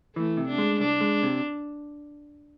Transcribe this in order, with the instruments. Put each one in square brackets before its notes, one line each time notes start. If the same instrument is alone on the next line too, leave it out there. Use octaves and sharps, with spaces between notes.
[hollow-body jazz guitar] E3 [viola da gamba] A3
[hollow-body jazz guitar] C3
[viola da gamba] D4
[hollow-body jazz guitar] G#3
[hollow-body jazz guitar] C2 [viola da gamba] D4
[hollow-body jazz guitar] G#3
C3